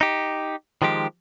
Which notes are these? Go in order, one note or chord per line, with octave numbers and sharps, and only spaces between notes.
D#4 G4
D#3 F3 G#3 G4